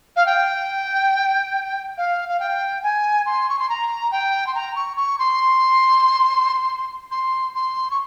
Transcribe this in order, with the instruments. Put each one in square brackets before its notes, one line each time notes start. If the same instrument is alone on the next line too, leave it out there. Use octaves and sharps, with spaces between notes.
[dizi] F5
G5
F5
F5
G5
G#5
C6
C#6
C6
A#5
G5
C6
A#5
C#6
C#6
C6
C6
C6
C#6